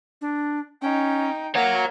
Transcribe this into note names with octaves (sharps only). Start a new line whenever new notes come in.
D4
C#4 D#4 G5
A#3 C#5 F#5 A#5